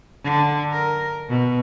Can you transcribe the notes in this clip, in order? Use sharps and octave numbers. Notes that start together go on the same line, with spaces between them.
D3
A#4
B2